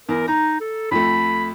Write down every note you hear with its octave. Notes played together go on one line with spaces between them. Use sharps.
E2 A#4
D#4 A#5
A4
F2 A3 B5